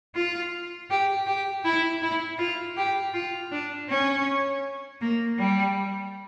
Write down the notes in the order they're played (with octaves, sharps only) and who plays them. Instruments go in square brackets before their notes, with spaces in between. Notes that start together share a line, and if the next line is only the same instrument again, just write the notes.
[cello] F4
G4
G4
E4
E4
F4
G4
F4
D4
C#4
A#3
G3